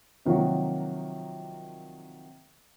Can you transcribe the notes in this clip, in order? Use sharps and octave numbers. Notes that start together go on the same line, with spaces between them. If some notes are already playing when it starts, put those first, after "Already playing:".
C3 D#3 F3 F#3 A#3 F#4